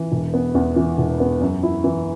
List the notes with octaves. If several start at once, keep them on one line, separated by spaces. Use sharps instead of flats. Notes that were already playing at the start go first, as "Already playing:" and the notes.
Already playing: E3
E1
B3
E2
E3
E1
B3
F#2
E4
E3